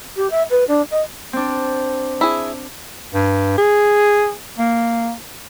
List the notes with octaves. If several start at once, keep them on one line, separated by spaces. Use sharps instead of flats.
G4
E5
B4
D4
D#5
C4 D4
E4 G#4
G2
G#4
A#3